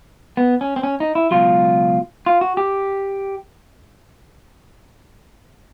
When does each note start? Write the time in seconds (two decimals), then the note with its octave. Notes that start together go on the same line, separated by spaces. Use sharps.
0.37 B3
0.61 C#4
0.76 C4
0.83 C#4
1.00 D#4
1.15 E4
1.31 C#2 B2 F#3 F4
2.26 F4
2.41 F#4
2.57 G4